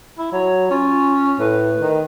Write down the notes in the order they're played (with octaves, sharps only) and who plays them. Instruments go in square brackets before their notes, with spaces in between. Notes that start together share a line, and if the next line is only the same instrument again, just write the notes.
[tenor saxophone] E4
[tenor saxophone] F#3 [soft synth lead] C#5
[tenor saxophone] C#4 [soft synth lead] F4
[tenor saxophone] A2 [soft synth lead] B4
[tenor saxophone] D#3